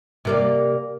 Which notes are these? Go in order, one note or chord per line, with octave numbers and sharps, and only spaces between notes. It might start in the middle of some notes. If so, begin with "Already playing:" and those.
C3 A#3 D5